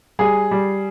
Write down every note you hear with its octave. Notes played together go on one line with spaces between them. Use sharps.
G3 G#4
G3